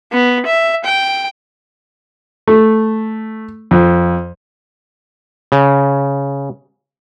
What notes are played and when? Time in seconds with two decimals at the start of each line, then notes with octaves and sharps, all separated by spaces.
0.12 B3
0.46 E5
0.84 G5
2.47 A3
3.71 F2
5.52 C#3